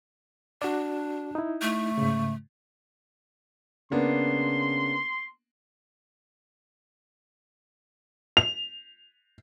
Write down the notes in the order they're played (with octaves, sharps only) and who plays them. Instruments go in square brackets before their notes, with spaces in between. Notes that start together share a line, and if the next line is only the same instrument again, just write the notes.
[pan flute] D4 [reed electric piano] F#4 D5
[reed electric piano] D#4 E4
[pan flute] A3
[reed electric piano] G#2 C#3
[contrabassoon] C#3 [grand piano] A#3 B3 D4 [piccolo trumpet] C6
[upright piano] F7